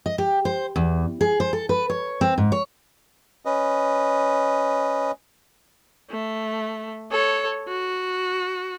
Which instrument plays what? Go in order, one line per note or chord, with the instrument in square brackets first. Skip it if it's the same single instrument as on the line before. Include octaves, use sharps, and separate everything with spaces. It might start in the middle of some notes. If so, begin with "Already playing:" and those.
[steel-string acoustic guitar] D#5
G4
C5
E2
G#4
C5
A4
B4
C#5
C4
G#2
C#5
[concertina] C#4 B4 D#5
[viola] A3
A4 C#5
F#4